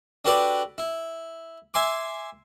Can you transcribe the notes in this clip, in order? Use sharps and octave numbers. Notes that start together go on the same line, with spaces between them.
D4 F#4 G4 A4 B4 D5
E4
E5 G#5 C6 D6